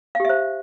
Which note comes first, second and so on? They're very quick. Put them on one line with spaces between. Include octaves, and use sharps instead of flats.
F5 G4 E5 C5